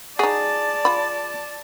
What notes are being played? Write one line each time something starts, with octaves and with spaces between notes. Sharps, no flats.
D#4 F#4 G#4 D5 A5
F4 B5